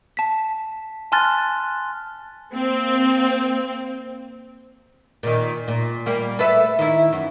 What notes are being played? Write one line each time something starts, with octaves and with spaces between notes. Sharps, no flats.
A5 B6
G#5 A5 C6 F6 F#6 A6
A#3 C4
A#2 D#3
A#2
G3 A#3
A4 B4 E5
D#3 E4
F#2